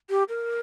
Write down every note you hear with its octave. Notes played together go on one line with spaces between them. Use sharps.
G4
A#4